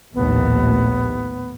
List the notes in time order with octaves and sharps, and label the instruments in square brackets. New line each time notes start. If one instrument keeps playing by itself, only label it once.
[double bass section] A#1 D#2 A2 [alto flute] B3